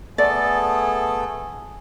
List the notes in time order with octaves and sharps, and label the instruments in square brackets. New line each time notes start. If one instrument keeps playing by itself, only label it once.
[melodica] A3 B3 A4 [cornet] G#4 [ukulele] D5